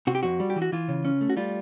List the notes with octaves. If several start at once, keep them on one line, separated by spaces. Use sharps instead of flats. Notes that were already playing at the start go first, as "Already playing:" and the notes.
C3 F#4
G4
F2 F#4
G3
G4
E3
F#4
E3 F4
C#3
C#4
A3
F#4
G3 F4